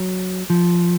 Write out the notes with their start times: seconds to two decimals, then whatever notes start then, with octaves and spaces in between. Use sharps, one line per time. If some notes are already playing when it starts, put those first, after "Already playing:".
Already playing: F#3
0.50 F3